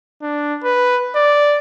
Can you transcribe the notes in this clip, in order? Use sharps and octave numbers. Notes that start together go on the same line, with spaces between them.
D4
B4
D5